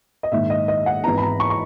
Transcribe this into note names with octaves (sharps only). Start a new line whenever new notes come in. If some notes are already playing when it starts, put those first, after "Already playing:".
D#5
A#1 G#2 D#3 E5
D#5
D#5
F#5
G#1 G#2 E3 B3 A#5
B5
A#5
C#6
C#6